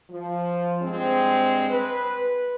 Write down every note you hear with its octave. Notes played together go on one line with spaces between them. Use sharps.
F3
G2 G#3 C4
B4